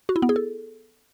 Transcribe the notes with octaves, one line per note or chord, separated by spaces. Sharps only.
F#4
E4
B3
G#4
A4